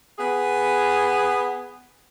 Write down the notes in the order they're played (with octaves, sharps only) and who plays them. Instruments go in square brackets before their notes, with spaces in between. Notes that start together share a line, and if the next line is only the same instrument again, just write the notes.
[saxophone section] B3 G#4